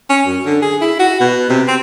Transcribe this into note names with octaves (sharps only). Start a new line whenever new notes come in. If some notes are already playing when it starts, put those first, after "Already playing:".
C#4
F#2
D3
G#4
E4
F#4
B2
C3
C4